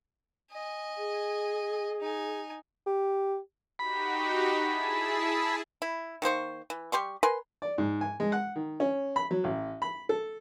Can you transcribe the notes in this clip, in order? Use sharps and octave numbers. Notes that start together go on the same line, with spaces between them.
D#5 G#5
G#4
D#4 G#5
G4
D#4 F#4 G4 B5
E4 G#4 A5
E4
D#3 A#3 C5 C#6
E3
G3 G4 C6 C#6
A#4 B4 G#5 C6
D5
G#2
G#5
G#3
F#5
D#3
C#4
B5
F#3
A1
B5
A4